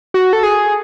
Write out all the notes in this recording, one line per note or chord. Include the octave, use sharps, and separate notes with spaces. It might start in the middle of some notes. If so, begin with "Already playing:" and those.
F#4
A4
G#4